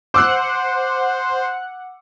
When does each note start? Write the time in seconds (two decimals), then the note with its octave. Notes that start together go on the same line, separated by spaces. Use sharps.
0.14 C5 F#5 D6 E6 F#6